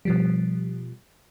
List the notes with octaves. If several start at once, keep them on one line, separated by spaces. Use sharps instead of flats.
B2 F3 G3